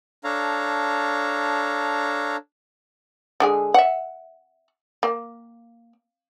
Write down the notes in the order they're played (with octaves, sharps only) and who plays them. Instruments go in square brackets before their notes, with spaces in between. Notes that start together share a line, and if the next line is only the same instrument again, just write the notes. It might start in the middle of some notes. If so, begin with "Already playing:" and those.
[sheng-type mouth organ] D4 A4 C#5 F5 A#5
[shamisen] D3 G#3 G#4
E5 F#5
A#3